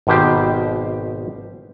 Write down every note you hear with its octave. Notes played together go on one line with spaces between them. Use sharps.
G#1 B2 D#3 G4 C5